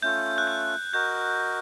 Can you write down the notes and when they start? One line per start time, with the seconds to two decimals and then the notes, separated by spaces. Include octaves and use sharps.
0.02 A3 C#4 F4 A4 G6
0.38 F#6
0.47 G6
0.93 F#4 A#4 D#5 G6